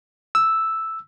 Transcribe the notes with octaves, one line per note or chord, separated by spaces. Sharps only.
E6